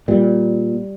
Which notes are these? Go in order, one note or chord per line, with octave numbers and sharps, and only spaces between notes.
A#2 G3